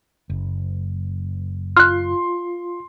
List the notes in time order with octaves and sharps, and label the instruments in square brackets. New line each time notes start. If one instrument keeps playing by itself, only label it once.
[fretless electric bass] F#1
[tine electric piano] F4 [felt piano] C6 [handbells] F6 F#6